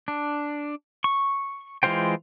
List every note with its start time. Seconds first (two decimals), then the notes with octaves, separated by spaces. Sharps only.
0.08 D4
1.04 C#6
1.83 E3 G#3 F4 C5 G5